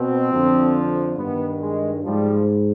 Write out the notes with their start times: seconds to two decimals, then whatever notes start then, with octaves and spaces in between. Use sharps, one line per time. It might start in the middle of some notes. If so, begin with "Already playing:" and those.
Already playing: B2 C4
0.31 F2 D3 F3
1.17 G2 D#3 B3
1.61 G#3
2.04 G#2 F3 G3